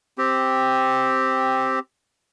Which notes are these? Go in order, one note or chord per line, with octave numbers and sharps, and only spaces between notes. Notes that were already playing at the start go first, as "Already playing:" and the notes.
C4 G4